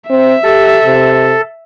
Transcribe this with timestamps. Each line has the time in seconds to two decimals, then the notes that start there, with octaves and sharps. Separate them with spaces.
0.10 C4 E5
0.44 G4 A4
0.85 C3